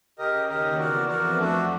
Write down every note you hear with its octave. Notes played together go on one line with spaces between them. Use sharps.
C#3 G4 A#4 D#5
D#2 D#3 G4 A#4 D#5
E2 E3 F#4 A#4 D5
F2 F3 F#4 A#4 D5
F2 F3 A3 D4 F#4